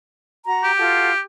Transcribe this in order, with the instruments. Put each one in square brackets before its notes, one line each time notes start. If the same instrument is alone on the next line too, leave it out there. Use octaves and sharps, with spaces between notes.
[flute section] F#4 A#5
[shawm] G4
[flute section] F4 F#4 A4